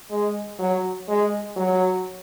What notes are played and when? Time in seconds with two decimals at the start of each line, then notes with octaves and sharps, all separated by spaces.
0.11 G#3
0.59 F#3
1.08 G#3
1.56 F#3